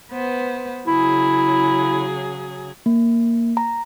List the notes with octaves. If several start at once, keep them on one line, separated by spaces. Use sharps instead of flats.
B3 B4 C5
C#3 F#3 E4 G#4
A#3
A#5